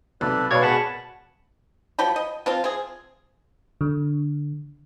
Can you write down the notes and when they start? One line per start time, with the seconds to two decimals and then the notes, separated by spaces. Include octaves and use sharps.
0.21 B1 C3 A4 B4 D5
0.51 B2 B4 C#5 D5 F5 G#6
0.62 B2 G#4 F#5 A5 B5 C#6
1.99 F3 F#3 G5 B5
2.16 D#5
2.46 F3 C4 F4
2.64 C4 G#4
3.81 D3